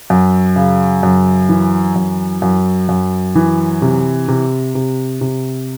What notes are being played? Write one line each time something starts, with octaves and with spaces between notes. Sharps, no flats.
F#2
C#3
F#2
E3
F#2
F#2
F#2
E3
C3
C3
C3
C3